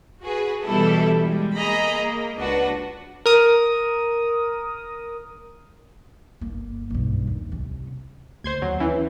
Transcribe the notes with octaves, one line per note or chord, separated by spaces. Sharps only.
F#4 G#4 B4
B2 E3 G3 E4 A4
G3 G#3
A#3 G#4 D#5 A#5 B5
A#3
C#2 D4 F#4 B4
A#4 D#6
G1 A#3
B1 G2
D#2
C2 C#4
D2 C5 C6 G#6
D#2 F#3
E3 C#4